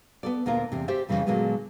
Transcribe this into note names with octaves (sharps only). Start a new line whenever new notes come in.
B3 A4 D5
D2 A#2 A#3 B3 F4 A#4
E2 C3
G4 C5 D5 E5
F2 A#2 C#3 E3 G3
A#2 D3 F#3 G#3 A#3 B3